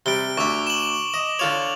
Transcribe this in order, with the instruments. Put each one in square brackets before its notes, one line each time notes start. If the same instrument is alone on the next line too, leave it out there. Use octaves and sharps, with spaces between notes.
[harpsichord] C3 G3 [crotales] D7 G7
[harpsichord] D2 E5 [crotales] C#6 D6
[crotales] E7 F#7
[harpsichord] D#5
[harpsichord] D3 F4 C#5 [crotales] F7